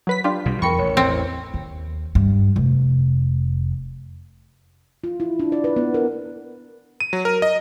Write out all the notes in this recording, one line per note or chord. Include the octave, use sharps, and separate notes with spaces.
F#3 B4 B6
D4 F4 G4 C6
B1 B2 G3
E2 A#4 G5 B5 C#6 C#7
A1 C#5
A1 E2 C4
D#2
G2
F1
F4
E4
D4
D5
B4
B3
A#4
D#7
F#3
A#4
D#5